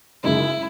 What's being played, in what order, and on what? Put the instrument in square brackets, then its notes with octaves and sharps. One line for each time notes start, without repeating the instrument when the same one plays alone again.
[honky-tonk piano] F#2 C#3 G#3 D#4 [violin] E4